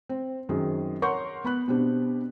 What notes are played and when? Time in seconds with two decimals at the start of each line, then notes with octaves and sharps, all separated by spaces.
0.09 C4
0.49 F#2 D#3 C4 G#4
1.02 A#4 C#5 F#5 C6 C#6 G6
1.44 B3 B5 F#6
1.68 B2 B3 C4 D4 G4